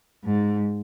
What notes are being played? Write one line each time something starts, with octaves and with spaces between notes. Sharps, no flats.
G#2